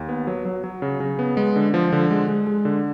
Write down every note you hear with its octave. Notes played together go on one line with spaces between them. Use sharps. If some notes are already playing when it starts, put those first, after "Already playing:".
Already playing: D#2
B3
F#3
F#3
F#3
C#3
C#3
B3
G#3
D3
F3
D3
G#3
G#3
G#3
D3